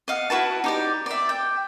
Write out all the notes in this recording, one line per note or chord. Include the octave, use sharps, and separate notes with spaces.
D#5 F5 F#5
E4 F#4 B4 A5
D#4 G4 D5
D5 E5
G5